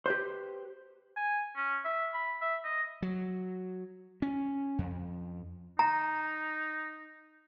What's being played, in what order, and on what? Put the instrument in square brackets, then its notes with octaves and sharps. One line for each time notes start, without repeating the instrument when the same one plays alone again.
[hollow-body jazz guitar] G4 B4 C5
[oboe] G#5
C#4
E5
B5
E5
D#5
[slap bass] F#3
C#4
F2
[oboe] D#4 [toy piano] A#5